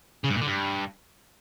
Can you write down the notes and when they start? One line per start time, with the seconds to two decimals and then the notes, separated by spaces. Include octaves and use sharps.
0.24 C#3
0.30 G2
0.36 A#2
0.41 D3
0.47 G2